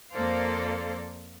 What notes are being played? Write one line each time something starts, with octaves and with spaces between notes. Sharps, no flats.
F2 A#3 A4 C5 D5 F5